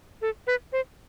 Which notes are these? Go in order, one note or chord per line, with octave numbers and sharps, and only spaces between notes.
A4
B4
C5